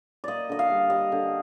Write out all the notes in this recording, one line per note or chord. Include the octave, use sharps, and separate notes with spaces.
A#3 D5 D#5
D3 D#5
F5
G3
G3 D#5
D3